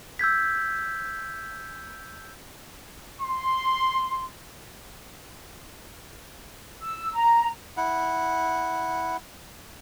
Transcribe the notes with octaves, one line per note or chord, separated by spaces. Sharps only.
E6 G6 G#6 B6
C6
E6
A#5
E4 F#5